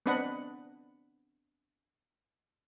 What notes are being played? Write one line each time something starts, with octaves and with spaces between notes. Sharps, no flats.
B3 C4 D4 B4 D#5 F#5